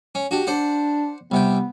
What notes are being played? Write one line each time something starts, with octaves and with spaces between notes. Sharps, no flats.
C#4
D4 F#4 G4
D4 C5 D5 F#5
C2 C3 B3 G5